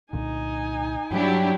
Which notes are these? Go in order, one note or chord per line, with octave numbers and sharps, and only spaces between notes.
C2 A#2 D3 D#4 G#5
G2 F#3 D4 E4 G4